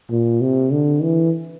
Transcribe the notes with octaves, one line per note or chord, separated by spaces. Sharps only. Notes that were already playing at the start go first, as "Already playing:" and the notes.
A#2
C3
D3
E3